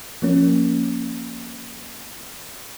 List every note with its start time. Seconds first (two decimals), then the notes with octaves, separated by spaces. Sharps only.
0.22 F3 A#3 C#4